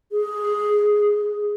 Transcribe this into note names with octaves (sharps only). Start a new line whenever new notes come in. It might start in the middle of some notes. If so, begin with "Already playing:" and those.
G#4